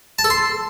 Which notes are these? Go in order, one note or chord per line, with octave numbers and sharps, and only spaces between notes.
A5
A4
C6